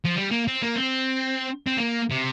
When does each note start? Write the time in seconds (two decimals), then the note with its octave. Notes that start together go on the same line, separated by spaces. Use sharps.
0.05 F3
0.16 G3
0.31 A#3
0.48 C4
0.62 A#3
0.76 C4
1.67 C4
1.78 A#3
2.11 C3